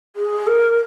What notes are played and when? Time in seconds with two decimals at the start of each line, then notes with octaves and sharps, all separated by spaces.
0.16 G#4
0.47 A#4